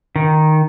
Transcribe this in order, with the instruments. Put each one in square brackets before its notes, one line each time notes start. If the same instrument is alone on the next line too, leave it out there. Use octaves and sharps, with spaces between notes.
[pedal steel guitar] D#3